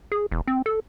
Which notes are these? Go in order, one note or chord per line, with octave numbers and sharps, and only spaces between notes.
G#4
E1
C4
A4